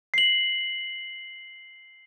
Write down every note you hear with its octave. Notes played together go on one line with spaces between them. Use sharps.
C7 F#7